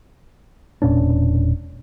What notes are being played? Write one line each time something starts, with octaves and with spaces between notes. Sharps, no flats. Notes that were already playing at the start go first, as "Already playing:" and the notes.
E1 A#2 C#4 D4